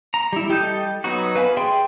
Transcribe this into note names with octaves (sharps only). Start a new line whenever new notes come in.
A#5
G3 E4
G3 G4 A4 D#5 G6
F#3 B3 D#4 F#4
B4 F5 G#5 B5
G#4 D5 E5 G5 C6